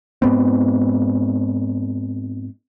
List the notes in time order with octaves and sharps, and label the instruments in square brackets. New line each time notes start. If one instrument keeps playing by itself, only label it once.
[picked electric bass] G#2 B3 C4